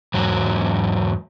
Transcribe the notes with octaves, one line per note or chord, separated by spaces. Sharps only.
E2 G#2 F#3